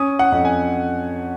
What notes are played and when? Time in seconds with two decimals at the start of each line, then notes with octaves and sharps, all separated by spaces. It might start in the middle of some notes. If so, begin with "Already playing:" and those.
Already playing: C#4 D#6
0.19 F#5
0.32 F2
0.45 G#5